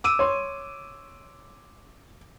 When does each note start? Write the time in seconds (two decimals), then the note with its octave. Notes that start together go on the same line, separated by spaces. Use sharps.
0.04 D6 E6 D#7
0.19 C#5 C6